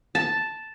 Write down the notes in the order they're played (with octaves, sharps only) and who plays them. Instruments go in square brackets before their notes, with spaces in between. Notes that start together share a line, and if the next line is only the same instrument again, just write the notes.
[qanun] A5